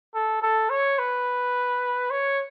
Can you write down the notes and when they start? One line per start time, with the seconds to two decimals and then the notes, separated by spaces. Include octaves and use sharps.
0.14 A4
0.42 A4
0.70 C#5
0.99 B4
2.11 C#5